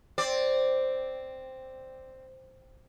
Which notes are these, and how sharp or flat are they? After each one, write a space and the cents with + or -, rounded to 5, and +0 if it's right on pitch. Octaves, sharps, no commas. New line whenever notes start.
C4 +0 D5 +0